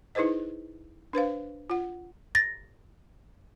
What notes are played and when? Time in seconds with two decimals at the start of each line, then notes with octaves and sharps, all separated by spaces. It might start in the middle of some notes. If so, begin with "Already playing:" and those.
0.15 D#4 E4 G#4 B4 C5 D#5
1.13 D4 B4 C5 F5
1.70 F4 F#5
2.35 A6 A#6